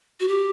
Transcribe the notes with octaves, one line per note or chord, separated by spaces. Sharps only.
F#4
G4